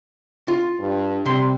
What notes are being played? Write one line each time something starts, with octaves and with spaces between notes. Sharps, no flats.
F4
G2
C3 G3 C6